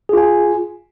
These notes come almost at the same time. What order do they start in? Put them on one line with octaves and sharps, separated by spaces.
G#4 F4 G#5